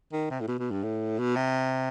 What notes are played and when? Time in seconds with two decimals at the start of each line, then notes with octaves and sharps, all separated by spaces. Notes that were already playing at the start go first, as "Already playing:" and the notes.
0.12 D#3
0.30 C3
0.41 A2
0.48 B2
0.59 B2
0.71 G2
0.83 A2
1.19 B2
1.36 C3